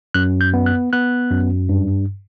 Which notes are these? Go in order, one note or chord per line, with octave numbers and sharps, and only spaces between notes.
F#2 F#6
G6
B3
F#6
B3 F#6
F#2
G2